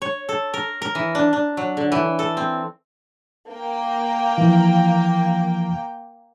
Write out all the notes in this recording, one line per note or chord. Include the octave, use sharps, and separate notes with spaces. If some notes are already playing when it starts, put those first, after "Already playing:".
C#5
A4
A#4
A#4
E3
D4
D4
F#3
D3
E3
A4
C4
A#3 G5
E3 F3